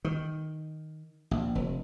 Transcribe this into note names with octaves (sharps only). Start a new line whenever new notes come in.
D#3
A#1
F1